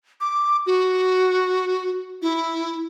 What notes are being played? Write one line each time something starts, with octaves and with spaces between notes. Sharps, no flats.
D6
F#4
E4